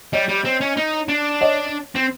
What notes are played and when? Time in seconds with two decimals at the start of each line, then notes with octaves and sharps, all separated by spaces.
0.13 G3 C#5 D#5
0.28 G3
0.45 C4
0.61 C#4
0.77 D#4
1.09 D4
1.41 C#5 D#5
1.95 C4